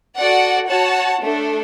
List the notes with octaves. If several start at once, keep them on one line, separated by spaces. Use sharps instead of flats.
F#4 A4 D5 F#5
F#4 C#5 F#5 A5
A3 D4 A4